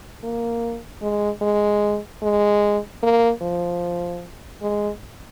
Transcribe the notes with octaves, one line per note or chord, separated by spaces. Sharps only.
A#3
G#3
G#3
G#3
A#3
F3
G#3